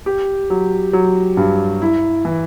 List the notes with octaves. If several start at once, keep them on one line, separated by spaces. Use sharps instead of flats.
G4
F#3
F#3
G2
E4
E3